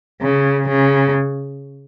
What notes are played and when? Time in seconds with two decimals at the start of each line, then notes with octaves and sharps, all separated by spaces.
0.22 C#3
0.69 C#3